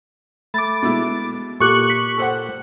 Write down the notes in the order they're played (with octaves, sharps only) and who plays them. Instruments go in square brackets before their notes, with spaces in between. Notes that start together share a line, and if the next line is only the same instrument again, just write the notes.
[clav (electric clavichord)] A3 [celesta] B5 [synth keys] D6 A6
[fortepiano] B2 G#3 E4
[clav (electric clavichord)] A#2 [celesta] G4 A4 D6 [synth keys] C#6 F#6
[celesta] B6
[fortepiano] A4 C5 F#5